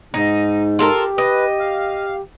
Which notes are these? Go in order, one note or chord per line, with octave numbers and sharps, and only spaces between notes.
G#2 D#4
F4 G4 A4 A#4
B4 D#5
F5